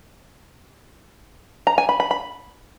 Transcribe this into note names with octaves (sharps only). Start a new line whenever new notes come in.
A#5
G#5
B5
B5
B5